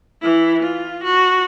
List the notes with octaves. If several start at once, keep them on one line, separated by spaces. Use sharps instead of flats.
E3 E4
F4
F#4